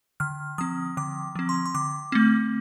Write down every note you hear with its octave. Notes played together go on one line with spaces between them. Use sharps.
D3 F6
F3 C4 D#6
D3 D6
F3 C4
C6
C6
D3 D6
A3 C4